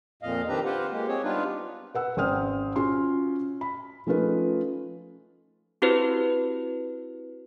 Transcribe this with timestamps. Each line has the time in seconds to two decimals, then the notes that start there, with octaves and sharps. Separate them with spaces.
0.22 F2 A#2 D#5 F5
0.48 D#3 C4 D4 G4 B4 A#5
0.65 F4 G4 B4 C5 F#5
0.92 G#3 A#3 G4
1.08 C4 G#4 C#5
1.24 G3 B3 D4 D#4 F4 B4
1.95 B4 F#5 E6
2.17 G#1 C#4 C5 G5 D#6 F6
2.76 C#4 F4 F#4 C6
3.61 B5
4.07 F3 A3 C#4 D#4 F4 B4
5.82 C4 E4 F#4 G4 B4 C5